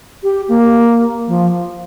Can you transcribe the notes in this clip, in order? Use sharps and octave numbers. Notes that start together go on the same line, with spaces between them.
G4
A#3
F3